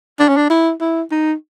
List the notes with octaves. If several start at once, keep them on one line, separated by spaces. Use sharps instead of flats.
D4
C#4
D4
E4
E4
D#4